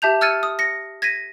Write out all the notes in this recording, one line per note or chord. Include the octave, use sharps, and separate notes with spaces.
G4 E5 A5 G6 F7
E6 F6 G#6 A6 C#7 D#7
D#6
A#6 C#7
G#6 A#6 B6 D#7